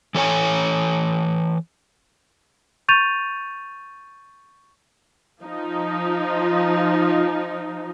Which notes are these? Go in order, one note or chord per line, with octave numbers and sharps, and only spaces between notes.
E3 A4 C#5 G#5
C#6 G6 A6 D#7 F7
F3 D#4